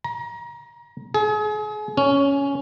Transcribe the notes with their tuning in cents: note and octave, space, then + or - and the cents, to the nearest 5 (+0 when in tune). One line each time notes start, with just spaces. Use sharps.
A#5 +30
G#4 +35
C#4 +10